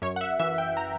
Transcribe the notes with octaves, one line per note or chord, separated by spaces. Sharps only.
F#2 C#5
F#5
E5
E3 E5
G5
A#5